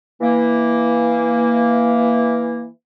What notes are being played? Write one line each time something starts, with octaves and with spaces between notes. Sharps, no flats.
E3 A#3